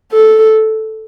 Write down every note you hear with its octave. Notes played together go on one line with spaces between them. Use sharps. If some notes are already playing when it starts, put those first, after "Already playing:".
A4